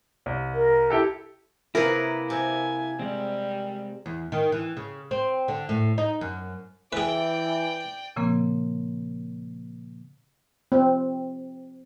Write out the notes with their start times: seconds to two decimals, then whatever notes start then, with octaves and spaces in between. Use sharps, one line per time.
0.26 C2
0.54 A#4
0.90 E4 G4 A4
1.75 C3 A#3 E4 G#4 A#4 B4
2.30 C3 G#5
2.99 G3 G#3 C4
4.06 E2
4.32 D#3
4.52 E3
4.77 C#3
5.11 C4
5.48 D3
5.69 A2
5.98 D#4
6.21 F#2
6.93 E3 G#4 B4 D5 G5
8.16 A#2 C#3 F3 A#3 C4
10.72 C4